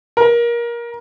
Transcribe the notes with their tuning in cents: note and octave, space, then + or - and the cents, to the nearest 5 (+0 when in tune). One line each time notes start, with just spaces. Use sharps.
A#4 +20